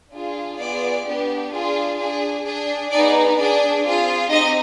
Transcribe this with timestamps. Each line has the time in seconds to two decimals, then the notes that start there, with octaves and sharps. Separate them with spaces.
0.11 D4 F4 G#4
0.58 B3 F4 G#4 D5
1.04 B3 D4 G4
1.52 D4 F4 G#4
1.98 D4 G#4
2.44 D4 G#4
2.91 B3 D#4 G#4 D5
3.37 D4 G#4 D5
3.84 C4 F4 G#4
4.30 C4 D#4 G4 D#5